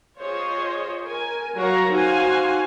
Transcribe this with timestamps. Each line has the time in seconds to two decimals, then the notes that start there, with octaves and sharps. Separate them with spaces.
0.20 F4 G#4 C5 C#5 D#5
1.06 A#4 G#5
1.56 F#3 F#4 A#4 C#5 F5 A#5
1.91 D#4 F#4 C5 F5 G#5